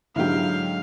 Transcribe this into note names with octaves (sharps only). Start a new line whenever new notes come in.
G#2 D3 F#3 E4 G4 F5